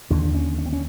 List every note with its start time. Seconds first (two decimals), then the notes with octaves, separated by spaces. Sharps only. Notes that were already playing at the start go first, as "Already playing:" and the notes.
0.11 D#2 D3 D4
0.35 C#4
0.59 C#4
0.66 C4
0.73 C#4